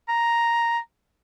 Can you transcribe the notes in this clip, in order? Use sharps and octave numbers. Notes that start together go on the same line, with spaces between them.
A#5